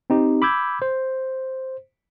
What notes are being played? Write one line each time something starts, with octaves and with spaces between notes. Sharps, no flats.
C4 D#4 G4
B5 D6 E6 G6 G#6
C5